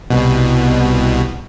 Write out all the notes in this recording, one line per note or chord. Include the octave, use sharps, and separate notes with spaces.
C2 B2